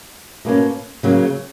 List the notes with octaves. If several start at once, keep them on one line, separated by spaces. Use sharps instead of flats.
B2 A#3 C#4
C#3 F#3 A#3